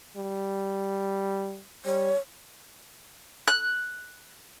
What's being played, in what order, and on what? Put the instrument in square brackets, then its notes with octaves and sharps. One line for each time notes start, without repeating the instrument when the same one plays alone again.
[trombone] G3
[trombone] G3 [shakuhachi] C#5
[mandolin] F#6